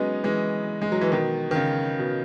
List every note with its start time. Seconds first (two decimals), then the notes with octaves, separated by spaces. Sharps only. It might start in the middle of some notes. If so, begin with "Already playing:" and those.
Already playing: F#3 G#3 B3 C#4 D#4
0.24 E3 G#3
0.82 G#3
0.92 F#3
1.01 E3
1.11 B2 D#3
1.51 D#3
1.55 C#3
1.99 B2